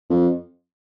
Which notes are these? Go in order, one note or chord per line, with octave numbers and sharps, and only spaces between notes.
F2